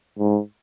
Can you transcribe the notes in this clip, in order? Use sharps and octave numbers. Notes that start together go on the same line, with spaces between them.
G#2